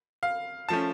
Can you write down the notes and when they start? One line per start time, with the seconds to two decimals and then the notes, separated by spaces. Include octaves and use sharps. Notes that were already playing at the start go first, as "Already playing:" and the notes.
0.23 F5
0.69 F3 A3 C#4 A5